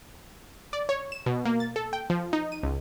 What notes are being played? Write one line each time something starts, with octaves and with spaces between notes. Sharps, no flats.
D5
C#5
E7
B2
A#3
A6
A4
G5
F3
D#4
D#7
C#2